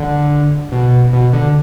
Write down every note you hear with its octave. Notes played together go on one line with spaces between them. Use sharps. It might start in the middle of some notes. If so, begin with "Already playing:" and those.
Already playing: D3
B2
B2
D3